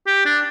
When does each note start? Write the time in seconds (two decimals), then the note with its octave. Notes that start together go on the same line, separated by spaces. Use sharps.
0.07 G4
0.25 D4